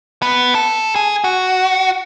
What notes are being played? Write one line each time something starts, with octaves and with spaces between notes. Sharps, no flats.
B3
A4
G#4
F#4